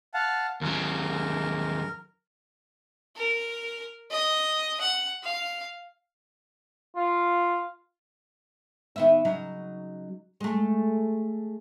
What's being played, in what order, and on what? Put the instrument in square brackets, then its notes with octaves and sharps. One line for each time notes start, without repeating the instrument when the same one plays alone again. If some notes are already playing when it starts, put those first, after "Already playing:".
[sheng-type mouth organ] F5 F#5 A5
[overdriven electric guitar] D#2 F#3 [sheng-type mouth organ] A#4
[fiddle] A#4
D#5
F#5
F5
[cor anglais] F4
[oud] D#3 B3 E5
C#3 F#3 D#4
G#3 A3